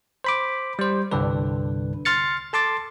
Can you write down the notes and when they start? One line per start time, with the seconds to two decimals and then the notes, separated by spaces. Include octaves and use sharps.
0.24 C5 B5 D6
0.79 G3 C5
1.11 C2 G2 D3 D4 B4
2.05 C6 F6 A6 C#7
2.53 A4 A5 C6 D6 A6